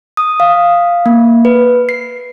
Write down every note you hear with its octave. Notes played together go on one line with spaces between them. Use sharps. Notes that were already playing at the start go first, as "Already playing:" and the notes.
D#6
F5
A#3
B4
C7